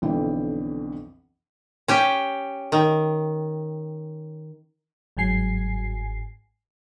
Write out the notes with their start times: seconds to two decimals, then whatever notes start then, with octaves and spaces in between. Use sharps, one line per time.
0.02 B1 F2 D3 E3 E4 G5
1.88 C#4 G4
2.72 D#3
5.17 G1 G#2 F#3 G#5 C7